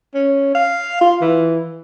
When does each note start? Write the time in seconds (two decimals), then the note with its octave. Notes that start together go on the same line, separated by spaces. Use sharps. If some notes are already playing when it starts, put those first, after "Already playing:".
0.14 C#4
0.55 F5
1.01 F4
1.21 E3